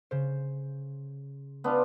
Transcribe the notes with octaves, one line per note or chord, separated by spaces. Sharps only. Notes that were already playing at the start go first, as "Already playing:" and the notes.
C#3 C5
B3 D4 F4